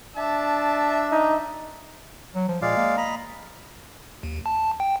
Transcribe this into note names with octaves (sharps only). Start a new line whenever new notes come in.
D4 E5 A5
D#4
F#3
F3
A#2 G#3 D5 F5
A#3
D#5 A#5 B5
D#2
A5
G5